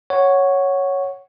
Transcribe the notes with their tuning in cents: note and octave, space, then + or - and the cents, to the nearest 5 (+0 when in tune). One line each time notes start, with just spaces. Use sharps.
C#5 +0 F#5 +0